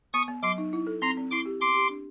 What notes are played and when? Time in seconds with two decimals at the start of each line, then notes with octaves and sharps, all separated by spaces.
0.13 B3 C#6 D#6
0.28 B3
0.42 F#3 C6 D6
0.58 D#4
0.73 E4
0.87 A4
1.02 C4 A#5 C6
1.17 C4
1.31 E4 C6 D6
1.46 G4
1.60 B3 C6 D6
1.75 G4
1.89 D4